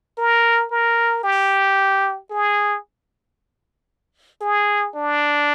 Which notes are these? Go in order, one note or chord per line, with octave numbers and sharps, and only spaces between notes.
A#4
A#4
G4
G#4
G#4
D4